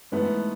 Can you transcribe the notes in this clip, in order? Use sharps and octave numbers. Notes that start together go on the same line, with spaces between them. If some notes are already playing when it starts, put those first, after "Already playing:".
G#2 E3 A3 B3 B4